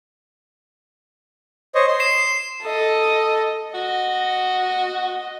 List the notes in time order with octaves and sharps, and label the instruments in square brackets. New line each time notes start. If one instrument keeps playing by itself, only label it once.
[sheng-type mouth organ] C5 C#5 D#5
C6
[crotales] C7 E7
[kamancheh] A4 D#5
[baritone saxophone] F#4 [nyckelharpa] D#5